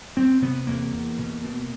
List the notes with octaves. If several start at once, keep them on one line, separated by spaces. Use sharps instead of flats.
E2 C4
C3 B3
E2 A#3
E2
B2
B2